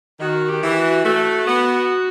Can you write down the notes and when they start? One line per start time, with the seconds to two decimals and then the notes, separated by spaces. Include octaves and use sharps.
0.20 D#3 F#4
0.48 G4
0.62 E3
0.77 F#4
1.05 A3 F#4
1.47 B3